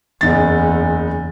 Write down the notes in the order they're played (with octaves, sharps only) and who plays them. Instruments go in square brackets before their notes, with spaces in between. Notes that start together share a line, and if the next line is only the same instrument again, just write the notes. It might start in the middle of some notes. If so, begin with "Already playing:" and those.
[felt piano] F#1 D#4 A6 [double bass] E2